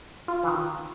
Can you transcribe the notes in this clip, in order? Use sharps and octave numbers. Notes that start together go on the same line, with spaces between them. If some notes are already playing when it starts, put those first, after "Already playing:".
F4
E3
D#3